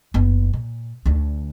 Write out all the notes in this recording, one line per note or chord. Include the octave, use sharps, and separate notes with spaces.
F#1 B3
A#2
D2 D4